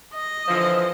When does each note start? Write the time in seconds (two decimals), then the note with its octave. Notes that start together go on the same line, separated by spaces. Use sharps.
0.14 D#5
0.48 D3 E3 F3